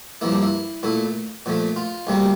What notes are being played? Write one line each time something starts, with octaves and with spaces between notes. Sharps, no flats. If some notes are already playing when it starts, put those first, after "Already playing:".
G2 F3 A#3 E4
D4
E4
A#2 A3 E4
A#2 F3 A3
F4
D2 C3 G3 A#3